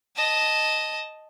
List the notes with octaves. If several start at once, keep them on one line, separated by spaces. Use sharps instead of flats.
D#5 A5